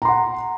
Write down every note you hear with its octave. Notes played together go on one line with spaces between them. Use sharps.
F#5 A#5 C6